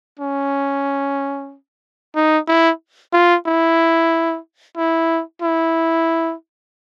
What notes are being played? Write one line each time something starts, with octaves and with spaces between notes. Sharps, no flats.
C#4
D#4
E4
F4
E4
E4
E4